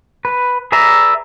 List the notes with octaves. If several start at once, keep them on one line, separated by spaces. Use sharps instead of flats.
B4
G#4 B4 D5 E5 A#5